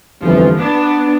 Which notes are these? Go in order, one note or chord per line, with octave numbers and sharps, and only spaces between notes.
G1 F2 E3 F3
B3 D4